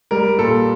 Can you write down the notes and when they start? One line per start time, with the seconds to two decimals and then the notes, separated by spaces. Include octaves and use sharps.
0.11 G3 A#4
0.38 A#2 A4